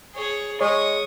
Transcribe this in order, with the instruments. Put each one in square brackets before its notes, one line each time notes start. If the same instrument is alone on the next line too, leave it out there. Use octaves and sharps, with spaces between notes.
[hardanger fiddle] G#4 C#5
[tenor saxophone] G#3 [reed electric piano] C#5 [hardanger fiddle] C#6 D#6